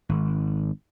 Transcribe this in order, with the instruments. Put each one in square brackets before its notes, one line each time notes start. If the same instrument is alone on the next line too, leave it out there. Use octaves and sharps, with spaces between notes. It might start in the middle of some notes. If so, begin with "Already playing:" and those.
[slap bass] G#1